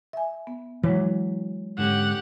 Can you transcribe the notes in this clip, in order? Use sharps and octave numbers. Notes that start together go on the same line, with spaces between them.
E5 G#5
B3
E3 F#3 G#3 C#5
G#2 D3 C#4 G4 F#5